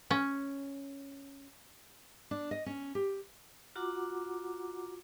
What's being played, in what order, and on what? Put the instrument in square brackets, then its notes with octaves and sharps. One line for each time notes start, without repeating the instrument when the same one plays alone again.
[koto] C#4
[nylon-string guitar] D4
D#5
C#4
G4
[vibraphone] F4 F#4 F#5 A#5 D6